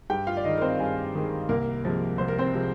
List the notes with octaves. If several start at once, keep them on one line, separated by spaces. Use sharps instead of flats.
G2 G4 G5
F4 F5
D5
D#3 G#3 D#4 D#5
A#4
C4 C5
G2 G#4
D#3 G#3
C2 A#3 A#4
C3 F3 G#3
C2 C5
A#4
C4 C5
C3 F3 G#3